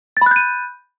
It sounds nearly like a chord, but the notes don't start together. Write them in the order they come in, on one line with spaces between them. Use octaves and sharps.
A6 B5 F#6 G6 D#7